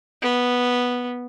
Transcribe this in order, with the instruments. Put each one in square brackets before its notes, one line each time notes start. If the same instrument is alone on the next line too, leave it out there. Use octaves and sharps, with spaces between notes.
[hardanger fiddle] B3